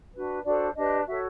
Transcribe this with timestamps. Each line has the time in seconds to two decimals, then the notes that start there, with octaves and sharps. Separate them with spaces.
0.14 D4 F#4 B4
0.44 D4 F#4 A4 C5 D5
0.76 D4 G4 B4 D#5
1.06 F#4 A4 C#5 E5